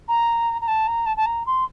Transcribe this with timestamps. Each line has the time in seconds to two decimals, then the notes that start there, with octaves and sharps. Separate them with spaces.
0.08 A#5
0.61 A#5
0.68 A5
0.87 A#5
1.06 A5
1.16 A5
1.26 A#5
1.46 C6